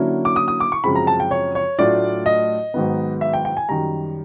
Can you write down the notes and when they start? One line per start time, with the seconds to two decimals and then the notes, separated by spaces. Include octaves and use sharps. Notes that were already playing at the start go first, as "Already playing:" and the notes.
Already playing: D3 F#3 A#3 C#4 E4
0.25 D6
0.36 D#6
0.48 D#6
0.60 D6
0.72 C#6
0.84 F#2 C#3 F3 G#3 C4 B5
0.96 A#5
1.07 A5
1.20 G5
1.31 C#5
1.55 C#5
1.79 A2 F#3 A3 D4 F4 D5
2.26 D#5
2.74 G#2 D#3 F#3 B3
3.21 E5
3.33 G5
3.45 G5
3.57 G#5
3.69 F#2 D#3 G3 A#5